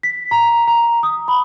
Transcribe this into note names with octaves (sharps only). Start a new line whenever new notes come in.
B6
A#5
A#5
D#6
B5